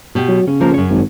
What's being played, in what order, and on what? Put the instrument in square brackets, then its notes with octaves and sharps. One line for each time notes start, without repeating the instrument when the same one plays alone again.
[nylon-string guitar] B2 G4
[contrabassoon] F#3
[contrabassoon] C#3 [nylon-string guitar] C#4
[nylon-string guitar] F3 A#3 A#4
F#2 C#5
[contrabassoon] G#1